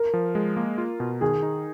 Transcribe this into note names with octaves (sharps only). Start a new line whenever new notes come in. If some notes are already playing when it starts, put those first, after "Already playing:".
Already playing: A#4
F3
G#3
A#3
F4
B2
D#3 G#4
D#4